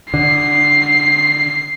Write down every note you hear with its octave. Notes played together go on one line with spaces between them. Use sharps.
D3 C7